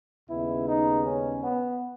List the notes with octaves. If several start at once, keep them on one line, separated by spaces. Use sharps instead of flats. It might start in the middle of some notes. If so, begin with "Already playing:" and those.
D#2 C#3 G#3 B3 E4
D#4
C#4
B3